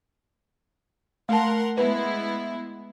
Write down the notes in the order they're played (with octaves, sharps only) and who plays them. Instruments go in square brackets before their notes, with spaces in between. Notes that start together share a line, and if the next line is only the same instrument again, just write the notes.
[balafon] A3 A5 [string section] A#4 F#5 C6
[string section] G#3 B3 E4 [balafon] B4